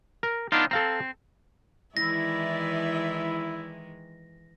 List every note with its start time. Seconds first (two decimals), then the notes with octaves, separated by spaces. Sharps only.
0.23 A#4
0.52 B3 D4 D#4 F4
0.71 C4 A4 F5 A#5
1.97 D#3 E3 G#3 E4 D5 E5 A#6